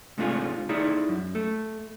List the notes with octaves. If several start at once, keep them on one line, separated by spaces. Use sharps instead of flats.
G#2 C3 A3 D4 F4 G#4
D#4 E4 G#4 D5 E5
F#2
A3